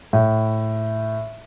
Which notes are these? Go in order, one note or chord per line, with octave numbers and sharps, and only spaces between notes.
A2